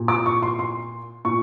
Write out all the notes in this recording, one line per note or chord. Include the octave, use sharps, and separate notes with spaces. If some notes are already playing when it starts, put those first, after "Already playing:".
Already playing: A#2
D6
C#6
C6
C6
A#2 C#6